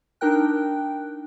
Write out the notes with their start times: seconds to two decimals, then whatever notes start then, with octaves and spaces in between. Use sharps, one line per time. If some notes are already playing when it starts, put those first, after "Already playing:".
0.21 D4 D#4 A#4 G5 F#6